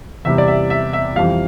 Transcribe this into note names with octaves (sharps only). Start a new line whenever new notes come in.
E2 C3 G3 E5
D5
E5
E5
E5
F2 E3 G3 F5